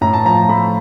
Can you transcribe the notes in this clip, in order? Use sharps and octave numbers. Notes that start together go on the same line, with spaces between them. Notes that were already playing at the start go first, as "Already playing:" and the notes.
A2 A#5
A5
F3 A#5
A3 B5